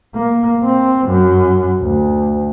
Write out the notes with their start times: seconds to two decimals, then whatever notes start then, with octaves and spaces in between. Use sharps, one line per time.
0.16 A#3
0.64 C4
1.08 F#2
1.82 D2